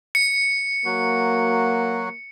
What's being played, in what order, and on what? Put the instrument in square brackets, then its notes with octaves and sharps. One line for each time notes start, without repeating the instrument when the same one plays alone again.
[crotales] C#7
[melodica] F#3 F#4 [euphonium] A#3